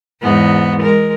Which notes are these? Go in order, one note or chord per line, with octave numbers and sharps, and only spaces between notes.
E2 G#2 B3
G#3 A#4